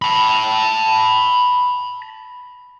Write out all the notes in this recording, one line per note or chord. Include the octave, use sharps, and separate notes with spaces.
A5 B5